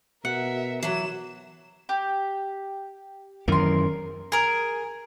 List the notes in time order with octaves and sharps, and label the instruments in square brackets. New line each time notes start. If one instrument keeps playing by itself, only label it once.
[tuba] B2 [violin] A#4 E5 [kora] F#5
[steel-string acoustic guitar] E3 F#3 [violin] E7
[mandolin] G4
[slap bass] F#2 D#3 E3 [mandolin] A#4 C6
[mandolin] G#4 A#4